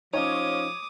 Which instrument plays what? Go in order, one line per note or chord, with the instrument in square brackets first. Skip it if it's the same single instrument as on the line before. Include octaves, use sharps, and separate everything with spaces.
[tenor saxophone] F3 [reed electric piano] C#4 D#4 [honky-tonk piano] C#5 [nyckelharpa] D6 D#6